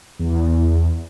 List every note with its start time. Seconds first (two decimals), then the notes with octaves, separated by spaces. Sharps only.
0.19 E2